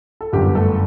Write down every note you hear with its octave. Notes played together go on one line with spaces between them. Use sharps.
A4
G1 F#2 D3 G4
A3 A4